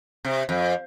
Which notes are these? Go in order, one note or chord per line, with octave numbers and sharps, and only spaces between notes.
C3
F2